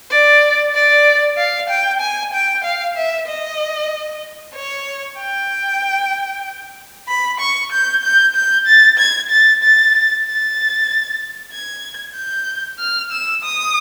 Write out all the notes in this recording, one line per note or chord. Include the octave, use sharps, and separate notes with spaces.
D5
D5
F5
G5
G#5
G5
F5
E5
D#5
C#5
G5
B5
C#6
G6
G6
G6
A6
G#6
A6
A6
A6
G#6
G6
F6
E6
D#6